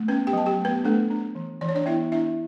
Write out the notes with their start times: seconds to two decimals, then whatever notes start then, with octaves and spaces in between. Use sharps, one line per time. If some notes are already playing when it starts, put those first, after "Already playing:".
Already playing: A3
0.08 B3 C#4 B4
0.27 G4 G5
0.33 F#3 A5
0.46 G4 G5
0.60 A3
0.65 B3 B4
0.84 A3 D4 A4
1.10 D4
1.35 E3
1.61 E3 D5
1.69 C#5
1.75 D4 D5
1.86 B3 E4 E5
2.12 D4 E4 E5